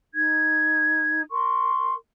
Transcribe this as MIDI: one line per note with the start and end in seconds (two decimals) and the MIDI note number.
0.13 1.21 63
0.13 1.21 92
1.30 1.92 70
1.30 1.92 84
1.30 1.92 85